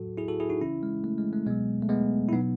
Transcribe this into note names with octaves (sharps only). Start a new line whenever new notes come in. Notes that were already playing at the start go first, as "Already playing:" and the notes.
Already playing: A2 F#3 F#4 A4
E4 G#4
F#4 A4
E4 G#4
D#4 F#4
C#3 E3 C#4 E4
G#3
A3
G#3
A3
B2 F#3 G#3 B3
A3
G#3 B3
E4
B2 F#3 B3 D#4